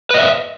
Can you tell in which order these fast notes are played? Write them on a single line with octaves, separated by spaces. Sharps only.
B4 D#5 E5